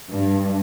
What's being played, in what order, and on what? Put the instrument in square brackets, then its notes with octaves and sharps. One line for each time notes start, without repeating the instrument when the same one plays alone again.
[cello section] G2